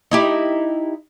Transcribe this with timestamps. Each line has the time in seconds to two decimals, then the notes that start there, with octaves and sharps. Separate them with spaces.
0.11 D#4 E4 G4